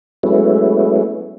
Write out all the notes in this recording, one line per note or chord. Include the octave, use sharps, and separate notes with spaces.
F#3 G#3 A3 B3 C#4 E4